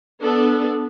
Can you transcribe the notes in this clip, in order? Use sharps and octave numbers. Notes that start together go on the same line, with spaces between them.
B3 D4 A4